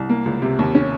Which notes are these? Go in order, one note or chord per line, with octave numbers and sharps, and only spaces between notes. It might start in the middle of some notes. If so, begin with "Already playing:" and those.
Already playing: C2
A#3
C#2
C3
D#2
C#4